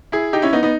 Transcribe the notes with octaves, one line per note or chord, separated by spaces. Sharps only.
E4 G#4
D#4 G4
C#4 E4
B3 D#4
B3 D#4